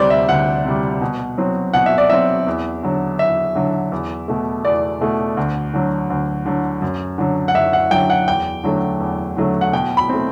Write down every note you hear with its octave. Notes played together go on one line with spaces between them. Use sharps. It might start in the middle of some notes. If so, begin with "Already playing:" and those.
Already playing: D2 C3 G3 C5 D5
E5
D2 F#5
C3 G3
B2
F#3 C4
B2 F#5
E5
D5
F#3 C4 E5
E2
D3 F#3
E2 E5
D3 F#3
E2
B2 A3
E2 D5
B2 A3
D2
D3 F#3
D2
D3 F#3
F#2
D3 F#3
F#5
F#2 E5
F#5
D3 F#3 G5
F#5
E2 G5
D3 F#3 A3
E2
D3 F#3 A3
F#5
B2 G5
B5
A3 C4